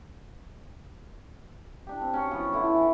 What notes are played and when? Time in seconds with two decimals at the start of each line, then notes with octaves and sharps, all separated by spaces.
1.87 D4 G4
2.01 C4
2.14 C#4 F#4 C#5
2.31 F3 F#3 B3
2.52 D3 E4 F4
2.74 E3